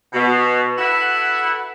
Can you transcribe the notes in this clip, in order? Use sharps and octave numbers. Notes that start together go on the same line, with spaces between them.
B2
E4 F#4 A4 B4 E5 F#5